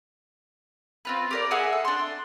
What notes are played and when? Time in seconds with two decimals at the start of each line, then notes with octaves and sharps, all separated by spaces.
1.05 C4 F4 B4
1.31 G4 A#4 D5
1.51 G#4 E5 F#5 G#5
1.72 A4
1.85 D4 C6